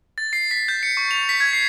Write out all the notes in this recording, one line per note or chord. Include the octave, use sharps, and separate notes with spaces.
A6
C7
B6
G6
C#7
C#6
F7
B6
G#6
C7